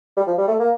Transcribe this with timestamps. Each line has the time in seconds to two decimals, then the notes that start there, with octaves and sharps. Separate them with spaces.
0.17 G3
0.27 F3
0.38 G3
0.48 A3
0.59 A#3